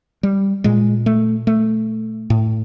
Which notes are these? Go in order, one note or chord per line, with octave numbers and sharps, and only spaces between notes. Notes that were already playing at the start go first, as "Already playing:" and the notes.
G3
A#2 G#3
A3
A3
A2